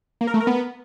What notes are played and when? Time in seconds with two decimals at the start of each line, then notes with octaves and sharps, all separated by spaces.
0.21 A#3
0.27 A#4
0.34 A3
0.40 A#4
0.47 B3